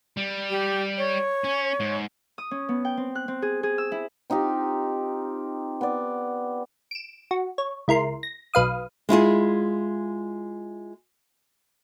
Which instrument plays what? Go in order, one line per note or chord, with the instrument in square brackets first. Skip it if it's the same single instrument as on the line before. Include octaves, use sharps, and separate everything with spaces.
[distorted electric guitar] G3
[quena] G4
C#5
[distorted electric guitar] C#4
G#2
[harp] D#6
C#4
B3
G5
C4
F#6
C4
G#4
G#4
E6
E4
[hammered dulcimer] C4 D#4 F4 G4
B3 D5
[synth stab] D7 E7
F#4
C#5
C#2 E4 A#4 C6
A#6
B1 B4 F5 D#6
[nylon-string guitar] G#3 E4 F4 G#4